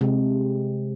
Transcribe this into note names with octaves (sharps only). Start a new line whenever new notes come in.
C3 G#3